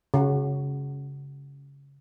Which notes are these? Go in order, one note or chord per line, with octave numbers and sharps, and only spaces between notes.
C#3 F#4